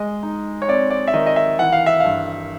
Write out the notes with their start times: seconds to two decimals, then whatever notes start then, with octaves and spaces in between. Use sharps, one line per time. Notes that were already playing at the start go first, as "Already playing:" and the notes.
Already playing: G#3 D#5
0.23 D#4
0.62 C#5
0.68 C4 D5
0.90 D5
1.07 E5
1.13 D#3 D#5
1.26 D#5
1.36 E5
1.59 E3 F#5
1.72 F5
1.86 E5
2.00 G2 F5